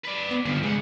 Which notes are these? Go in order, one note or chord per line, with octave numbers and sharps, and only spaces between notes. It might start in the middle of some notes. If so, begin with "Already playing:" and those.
B4 D5
B3
G2 D3 F3
C#3 G#3 F#5